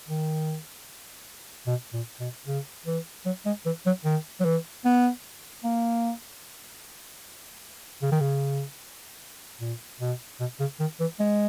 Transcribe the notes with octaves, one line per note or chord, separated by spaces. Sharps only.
D#3
B2
A#2
B2
C#3
E3
F#3
G#3
E3
F#3
D#3
F#3
E3
B3
A#3
C#3
D#3
C#3
A#2
B2
B2
C#3
D#3
E3
G#3